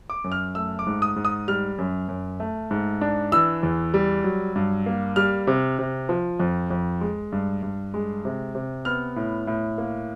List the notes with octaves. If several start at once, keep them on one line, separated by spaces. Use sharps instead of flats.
D6
F#2
F6
A3 E6
D6
G#2
D#6
G#2
D#6
G3 F6
F#2
F#2
A3
G#2
D4
E3 E6
E2
G3
F#3
G2
A#3
G3 F6
C3
C3
F3
F2
F2
G#3
G2
G2
G#3
C3
C3
B3 F6
A2
A2
A#3